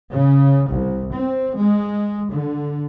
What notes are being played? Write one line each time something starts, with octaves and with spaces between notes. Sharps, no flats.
C#3
C2
C4
G#3
D3